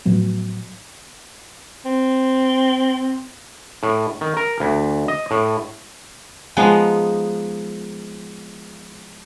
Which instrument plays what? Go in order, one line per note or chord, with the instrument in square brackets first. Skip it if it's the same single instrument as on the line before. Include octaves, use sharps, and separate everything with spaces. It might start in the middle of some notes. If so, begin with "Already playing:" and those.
[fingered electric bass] A2 F3 F#3 B3
[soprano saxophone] C4
[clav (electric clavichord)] A2
D#3
A#4
D2
D#5
A2
[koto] F3 G#3 B3 D#4